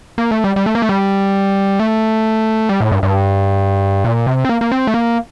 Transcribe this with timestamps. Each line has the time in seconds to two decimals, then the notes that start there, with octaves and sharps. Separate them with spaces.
0.18 A#3
0.31 A3
0.44 G3
0.56 G3
0.66 A3
0.75 A#3
0.82 A3
0.89 G3
1.79 A3
2.69 G3
2.80 A2
2.92 G2
3.03 G2
4.04 A#2
4.27 C3
4.45 C4
4.49 A#3
4.61 A#3
4.72 C4
4.87 A3
4.94 A#3